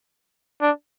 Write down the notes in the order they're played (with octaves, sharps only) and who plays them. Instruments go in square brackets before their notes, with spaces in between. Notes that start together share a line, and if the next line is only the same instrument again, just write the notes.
[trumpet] D4